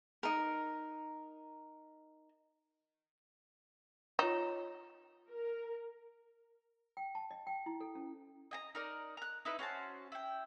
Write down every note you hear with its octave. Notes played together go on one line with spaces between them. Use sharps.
D#4 A#4
D#4 F4 C#5 E7
A#4
G5
A5
D#5
G5
E4
A4
C#4
D#5 G#5 A#5
D#4 A#4 D5
A#5 F#6
D#4 E4 B4
C#4 F#4 C5 A5
E4 G5